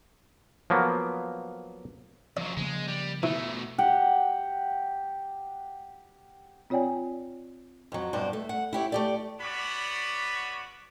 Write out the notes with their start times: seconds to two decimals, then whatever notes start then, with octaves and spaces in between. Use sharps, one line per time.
0.70 F3 F#3 A#3 B3
2.37 F2 F#3 D5
2.57 C#3 F3 G#3 A#3
2.88 G3
3.23 B2 E3 A3
3.78 G4 F#5 G5
6.70 C4 F4 C#5 D5 G5 G#5
7.92 F2 F#3
8.13 G2 B2 D4 C5
8.33 A3
8.49 F#5
8.73 E4 G4 C#5
8.92 A3 G4 D5
9.40 B3 C#4 F#4 D5 B5